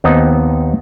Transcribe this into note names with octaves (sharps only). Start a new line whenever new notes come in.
D#2 B3 C4 D#4 D#5 A5